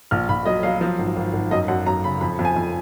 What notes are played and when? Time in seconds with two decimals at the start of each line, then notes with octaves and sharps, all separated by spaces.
0.11 A#1 F6
0.29 A#1 B5
0.45 F#3 D#5
0.63 F#3 F5
0.81 F3
0.99 G#1
1.17 G#1
1.33 G#1
1.51 F#2 D#5
1.68 F#2 F#5
1.86 F#2 A#5
2.04 C#3 B5
2.21 F2 B5
2.39 F2
2.45 G#5
2.56 F2